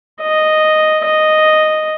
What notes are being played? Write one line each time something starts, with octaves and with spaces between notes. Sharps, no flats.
D#5
D#5